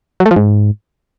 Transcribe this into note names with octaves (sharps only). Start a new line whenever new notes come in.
F#3
A3
F3
G#2